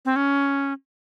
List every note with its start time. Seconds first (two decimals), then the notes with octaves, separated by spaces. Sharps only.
0.05 C4
0.16 C#4